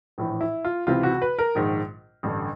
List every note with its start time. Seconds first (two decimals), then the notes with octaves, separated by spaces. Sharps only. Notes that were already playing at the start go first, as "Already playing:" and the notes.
0.18 A#1 A2 E3
0.41 E4
0.65 F4
0.87 C#2 C3 E3 F4
1.03 F#4
1.22 B4
1.39 A#4
1.55 A#1 G#2 D#3
2.23 A1 G2 D3